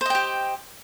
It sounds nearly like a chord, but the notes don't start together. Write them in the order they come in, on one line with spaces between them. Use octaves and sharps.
C5 D#5 G5 G4